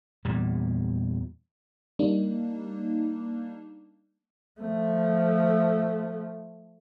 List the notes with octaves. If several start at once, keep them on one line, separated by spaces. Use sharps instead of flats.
E2 A#2 G3
G3 A#3 D4 D#4
F3 A3